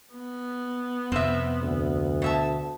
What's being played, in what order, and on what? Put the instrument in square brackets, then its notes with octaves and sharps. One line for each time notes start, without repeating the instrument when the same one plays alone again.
[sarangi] B3
[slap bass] F2 C3 [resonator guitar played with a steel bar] C4 E5
[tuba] D2
[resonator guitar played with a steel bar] B2 E5 A5